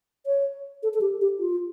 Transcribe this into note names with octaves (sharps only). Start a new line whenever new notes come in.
C#5
A4
A4
G4
G4
F4